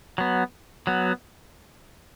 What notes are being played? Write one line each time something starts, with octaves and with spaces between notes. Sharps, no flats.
F#3 B3
F#3 B3